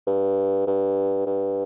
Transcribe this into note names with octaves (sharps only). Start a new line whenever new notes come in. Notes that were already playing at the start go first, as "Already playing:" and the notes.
G2
G2
G2